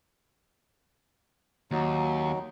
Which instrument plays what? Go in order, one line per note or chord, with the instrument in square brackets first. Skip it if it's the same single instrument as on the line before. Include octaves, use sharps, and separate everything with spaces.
[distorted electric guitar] D#2 [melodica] F#3 D#4